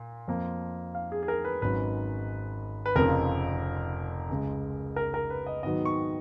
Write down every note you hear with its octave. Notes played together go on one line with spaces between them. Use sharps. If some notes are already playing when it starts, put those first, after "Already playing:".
Already playing: A#2
F2 F3 A#3
F5
G#4
G#4
A#4
B4
G#1 G#2 F#3 C#4 B4
B4
F1 F2 C#3 F3 A#4
C#2 C#3 G#3
A#4
A#4
B4
D#5
G#2 D#3 F#3 B3 D#5
C#6